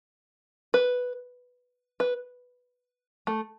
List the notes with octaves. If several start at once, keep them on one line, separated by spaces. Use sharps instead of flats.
B4
B4
A3